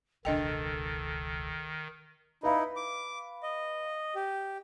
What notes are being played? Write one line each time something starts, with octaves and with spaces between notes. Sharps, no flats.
E1 C#2 D#3 D4 A4 D#5 G5
D#4 E4 B4 F5 B5
D6
D#5
G4